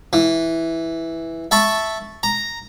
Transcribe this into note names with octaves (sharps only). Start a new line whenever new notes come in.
E3
E5 A5 B5 C#6
A#5